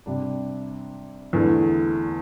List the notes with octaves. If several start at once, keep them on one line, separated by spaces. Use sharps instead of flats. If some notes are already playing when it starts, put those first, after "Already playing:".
C3 G3 D4
E2 D3 A3